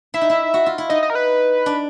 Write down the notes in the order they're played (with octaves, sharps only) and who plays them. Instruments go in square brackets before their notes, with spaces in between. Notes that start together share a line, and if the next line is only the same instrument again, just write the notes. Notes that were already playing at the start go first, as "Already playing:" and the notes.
[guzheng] E4 [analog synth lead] E5
[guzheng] D#4
E4
F#4
F4
E4
[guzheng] D#4 [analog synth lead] D#5
[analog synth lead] D#5
A#4
B4
[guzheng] D4